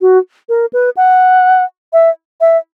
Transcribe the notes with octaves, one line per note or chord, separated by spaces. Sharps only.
F#4
A#4
B4
F#5
E5
E5